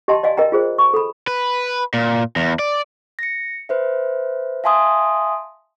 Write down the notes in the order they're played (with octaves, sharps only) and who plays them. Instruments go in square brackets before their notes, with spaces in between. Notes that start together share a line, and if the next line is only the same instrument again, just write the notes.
[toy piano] G4 D#5 E5 G5 A5 C6
D5 D#5 F5 G#5
A#4 D#5 E5 G5 A#5
F4 G#4 C5
G#5 C#6
A4 B5
[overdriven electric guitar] B4
A#2
E2
D5
[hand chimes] A#6 C#7
B4 C5 E5
E5 F5 G#5 A5 C6 D#6